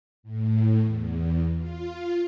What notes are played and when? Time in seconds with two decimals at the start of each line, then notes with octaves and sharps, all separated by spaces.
0.23 A2
0.81 E2
1.56 F4